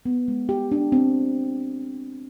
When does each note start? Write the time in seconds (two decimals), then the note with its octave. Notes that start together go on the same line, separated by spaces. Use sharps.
0.06 B3
0.28 G#3
0.49 G4
0.72 D4
0.92 C4